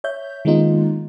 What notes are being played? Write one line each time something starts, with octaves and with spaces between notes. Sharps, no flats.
C#5 E5 G6
D#3 G#3 A#3 B3 D#4 F4